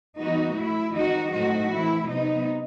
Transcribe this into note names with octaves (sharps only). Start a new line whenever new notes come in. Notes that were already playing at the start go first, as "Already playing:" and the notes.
E3 G3 B3 D#4 F#4
A2 F#3 A3 E4
D#3 G3 C4 D#4 F#4
A2 F#3 A3 C4 D#4 F#4
E3 A3 C4 E4
C3 F#3 B3 D#4